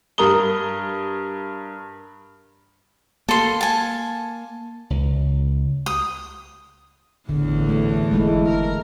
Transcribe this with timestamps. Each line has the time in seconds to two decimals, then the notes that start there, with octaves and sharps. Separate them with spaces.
0.18 G2 A#4 A#5 D#6 G7
3.29 A#3 A4 C6
3.61 G#5 A5
4.90 C#2
5.86 D#6
7.29 G#1 E2 A2 D3 E3
7.69 A3
8.11 F#1 G#3 A3 E4
8.48 A#4